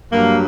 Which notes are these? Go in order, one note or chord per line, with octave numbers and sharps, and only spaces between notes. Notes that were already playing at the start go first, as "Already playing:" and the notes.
G2 F#3 A#3